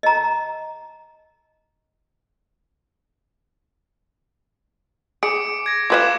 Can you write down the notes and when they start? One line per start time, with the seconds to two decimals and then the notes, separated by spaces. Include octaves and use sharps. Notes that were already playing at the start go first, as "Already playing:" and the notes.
0.03 D#5 A#5
5.23 G#4 D6 C#7 D7
5.66 G#6 A#6
5.90 F4 B4 F5 D6 G#6 E7